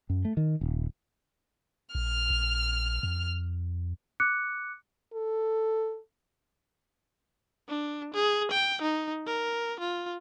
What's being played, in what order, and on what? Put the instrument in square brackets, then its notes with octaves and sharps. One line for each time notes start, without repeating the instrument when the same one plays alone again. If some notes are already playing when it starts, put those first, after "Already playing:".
[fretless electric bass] F#2
A3
D#3
D#1
[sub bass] A#1 [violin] F6
[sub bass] A#1
F2
[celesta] D6 F#6 C#7
[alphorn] A4
[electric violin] D4
G#4
G5
D#4
A#4
F4